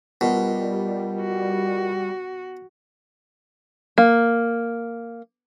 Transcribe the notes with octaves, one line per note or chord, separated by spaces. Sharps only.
B2 G3 F4 A#4 D#5
F#4
A#3